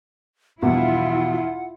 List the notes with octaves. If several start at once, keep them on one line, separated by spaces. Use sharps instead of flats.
E2 G2 B2 E3 F3 E4 F4 F#5